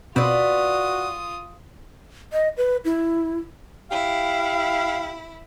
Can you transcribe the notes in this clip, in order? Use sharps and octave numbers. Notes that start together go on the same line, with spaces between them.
B2 C4 F4 F#4 B4 D5 D#6
D#5
B4
E4
E4 G4 F5